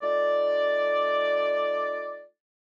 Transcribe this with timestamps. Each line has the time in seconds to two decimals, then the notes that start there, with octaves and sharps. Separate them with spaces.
0.02 A3 D#4 F4 D5